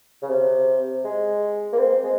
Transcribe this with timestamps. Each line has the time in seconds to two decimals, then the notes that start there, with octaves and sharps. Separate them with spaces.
0.22 C#3
0.29 C3
1.04 G#3
1.73 A#3
1.78 C4
2.03 G#3